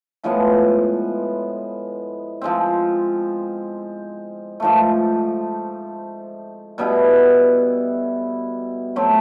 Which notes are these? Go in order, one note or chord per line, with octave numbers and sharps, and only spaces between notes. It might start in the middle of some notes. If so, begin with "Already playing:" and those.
A2 F3 G#3 B3
F3 G#3 C4
G#2 F3 A3
B2 G3 B3 E4
F#3 A3 C4